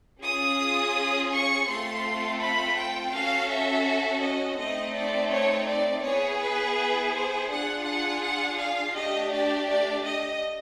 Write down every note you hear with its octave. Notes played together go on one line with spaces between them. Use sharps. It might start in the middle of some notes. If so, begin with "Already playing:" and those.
C#4 F4 G#4 D#6
C#6
A3 C4 F4 A4 C6
B5
G5
C#4 F#4 A4 F5
E5
D#5
A3 C4 D#4 D#5
D5
C#5
D5
B3 E4 G#4 C#5
B4
B4
C5
D4 F4 G#4 F#5
F#5
F#5
F5
A3 D4 G4 D#5
D5
D5
D#5